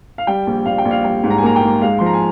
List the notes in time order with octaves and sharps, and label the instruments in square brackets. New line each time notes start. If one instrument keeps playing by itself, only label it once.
[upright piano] F5
G3 G5
A#1
A#1 F5
G5
A#1
F5
G3 G5
G#2
A#5
G#5
A#3 A#5
G5
G#2
G#3 F5
F3 C6
A#5
G#5